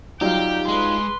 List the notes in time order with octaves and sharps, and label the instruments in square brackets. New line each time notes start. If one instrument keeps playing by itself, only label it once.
[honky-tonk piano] F#3 G3 [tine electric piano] D#4 F4 F5 [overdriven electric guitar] G4 [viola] G5
[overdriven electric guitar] G#3 [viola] B4 C6